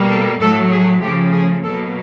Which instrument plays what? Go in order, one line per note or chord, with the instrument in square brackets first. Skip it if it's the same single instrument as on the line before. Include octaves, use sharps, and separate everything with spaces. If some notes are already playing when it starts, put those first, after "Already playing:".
Already playing: [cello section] B2 G3 A#3
A4
A2 F#3 A3 A4
G#4
C#3 F3 A3 G4
G#4
B2 F#3 A#3 A4